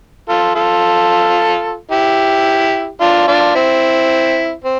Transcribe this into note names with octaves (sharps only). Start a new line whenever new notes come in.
F4 A4
F4 A4
E4 G4
D4 F4
D4 F4
C4 E4
C4